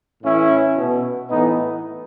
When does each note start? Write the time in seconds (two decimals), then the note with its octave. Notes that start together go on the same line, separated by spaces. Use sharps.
0.22 A2 E3 C#4 E4
0.76 B2
1.29 A2 E3 B3 D#4